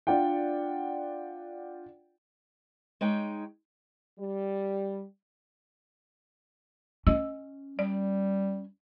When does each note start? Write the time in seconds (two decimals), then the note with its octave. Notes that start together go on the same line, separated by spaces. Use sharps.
0.07 D4 F4 D5 F#5 G5
3.01 G#3 D#4 C#5 G5
4.19 G3
7.07 C#4 D#5 E6
7.79 G3 D5